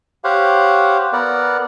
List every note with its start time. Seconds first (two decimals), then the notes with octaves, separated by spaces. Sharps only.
0.24 G4 C5 C#5 F5 F#5
1.13 B3 A#4 D5 F#5